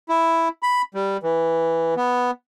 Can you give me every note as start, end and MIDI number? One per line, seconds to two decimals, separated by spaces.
0.09 0.49 64
0.63 0.82 83
0.95 1.17 55
1.23 1.94 52
1.97 2.31 59